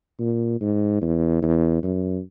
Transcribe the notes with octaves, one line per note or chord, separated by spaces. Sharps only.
A#2
G#2
E2
E2
F#2